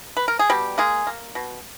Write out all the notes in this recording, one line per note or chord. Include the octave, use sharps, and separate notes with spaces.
B4
A#4
G#4
B2 G3 G4
G#3 A#3 G#4
A#3
B2